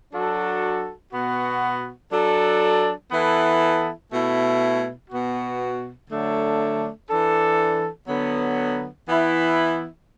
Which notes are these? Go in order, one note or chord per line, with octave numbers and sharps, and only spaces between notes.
F#3 D4 F#4 A4
B2 B3 F#4
F#3 D4 A4
E3 B3 E4 A4
B2 A3 E4
B2 B3 F#4
D3 F#3 A3 D4
E3 D4 A4
D3 F#3 B3
E3 B3 E4